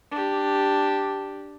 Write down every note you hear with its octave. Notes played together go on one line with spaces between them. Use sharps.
D4 G4